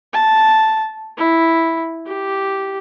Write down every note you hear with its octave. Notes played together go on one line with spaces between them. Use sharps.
A5
E4
G4